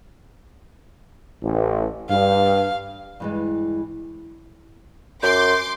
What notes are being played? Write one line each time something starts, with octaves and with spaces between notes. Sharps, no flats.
A1
G2 F5
G2 E3 G#3
F#2 C6 D6 G6